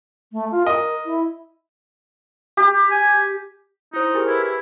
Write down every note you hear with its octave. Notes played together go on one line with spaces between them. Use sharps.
A3
F4
A#4 D#5
E4
G4
G#5
D#4 E4 C5
G4 G#4 A#4 G#5
E4 B4
E4 B4